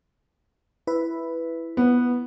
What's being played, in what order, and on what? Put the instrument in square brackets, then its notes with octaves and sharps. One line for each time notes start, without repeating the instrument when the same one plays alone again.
[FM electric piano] E4 B4
[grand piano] B3